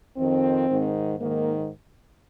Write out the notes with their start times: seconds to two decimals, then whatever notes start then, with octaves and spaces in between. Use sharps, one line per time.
0.17 F2 D#3 C4
0.68 G#2 D#3
1.19 G#2 D#3 A#3